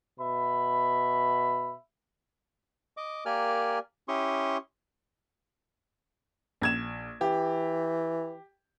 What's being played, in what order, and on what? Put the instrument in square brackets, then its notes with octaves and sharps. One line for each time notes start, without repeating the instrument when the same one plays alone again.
[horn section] B2 E5 B5
[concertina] D#5 D6
A#3 G4 A#4 D5 G#5 F6
C#4 E4 G4 C6 C#6 D#6
[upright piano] A#1 G#6 E7
[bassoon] E3 [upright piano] G4